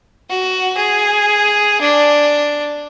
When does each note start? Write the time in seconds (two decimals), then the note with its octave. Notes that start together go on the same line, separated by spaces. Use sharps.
0.29 F#4
0.77 G#4
1.81 D4